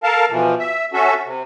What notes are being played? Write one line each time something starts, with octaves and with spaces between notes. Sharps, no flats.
A4 A#4 F5 A5
B2 E3 F3
E5
C#4 F#4 A4 E5
C3